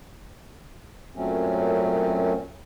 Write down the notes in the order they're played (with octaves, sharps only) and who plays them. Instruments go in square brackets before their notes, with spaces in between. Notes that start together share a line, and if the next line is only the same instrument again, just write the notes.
[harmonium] F#2 A#2 F#3 A3 C4 C#4